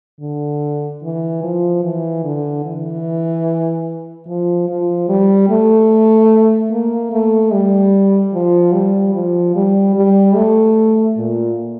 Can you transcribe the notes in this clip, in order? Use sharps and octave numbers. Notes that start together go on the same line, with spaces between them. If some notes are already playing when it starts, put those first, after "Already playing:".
D3
E3
F3
E3
D3
E3
F3
F3
G3
A3
A#3
A3
G3
F3
G3
F3
G3
G3
A3
A#2